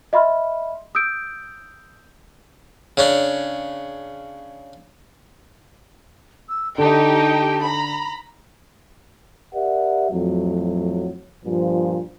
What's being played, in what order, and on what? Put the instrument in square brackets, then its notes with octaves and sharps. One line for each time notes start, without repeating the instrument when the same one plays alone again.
[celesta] D#5 E5 B5 C6 F6
D#6 E6 G6 D7
[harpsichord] C#3 C#4 D4
[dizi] E6
[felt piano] D3 [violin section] D#4 G4 G5 [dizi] A5
[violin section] A#5 B5
[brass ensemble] G4 A#4 D5 E5 F#5
F2 A2 F#3
G2 A#2 F3